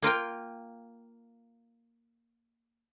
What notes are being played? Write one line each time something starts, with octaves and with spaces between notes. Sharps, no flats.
A#3 F4 A#4 G5